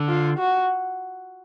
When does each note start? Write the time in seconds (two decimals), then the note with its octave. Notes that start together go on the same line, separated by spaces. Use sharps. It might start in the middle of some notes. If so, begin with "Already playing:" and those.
Already playing: D3
0.09 F4
0.39 F#4